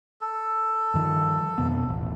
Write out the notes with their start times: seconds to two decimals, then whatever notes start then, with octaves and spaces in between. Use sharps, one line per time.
0.21 A4
0.94 G2 D#3 F3
1.58 F2 B2 B3
1.87 D#1 A1